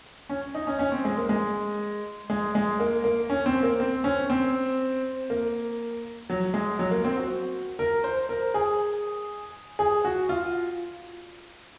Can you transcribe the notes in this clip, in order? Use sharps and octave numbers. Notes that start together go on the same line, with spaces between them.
C#4
D#4
C#4
C#4
C4
G#3
A#3
G#3
G#3
G#3
A#3
A#3
C#4
C4
A#3
C4
C#4
C4
A#3
F#3
G#3
F#3
A#3
C4
F#4
A#4
C5
A#4
G#4
G#4
F#4
F4